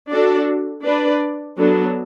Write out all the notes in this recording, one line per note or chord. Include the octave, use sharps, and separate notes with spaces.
D4 F#4 A4 D5
D4 B4 D5
F#3 B3 D4 A4